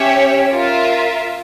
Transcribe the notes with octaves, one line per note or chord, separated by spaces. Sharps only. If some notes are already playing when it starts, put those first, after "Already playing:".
Already playing: C#4 G4 C#5 E5
F4 A#4 E5